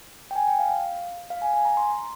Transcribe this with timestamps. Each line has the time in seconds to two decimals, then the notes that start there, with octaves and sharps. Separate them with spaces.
0.31 G5
0.35 G#5
0.47 G5
0.59 F5
0.71 F5
1.30 F5
1.42 G#5
1.54 G#5
1.65 A#5
1.77 C6